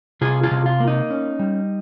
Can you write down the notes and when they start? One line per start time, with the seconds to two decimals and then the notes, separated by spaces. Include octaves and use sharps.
0.21 C3 F4 G#4
0.43 F4 G#4
0.51 C3
0.66 F4
0.80 A#3
0.88 D#4
1.10 C#4
1.39 G3